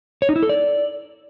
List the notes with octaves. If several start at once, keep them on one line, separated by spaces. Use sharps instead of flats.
C#5
D#4
E4
A4
D5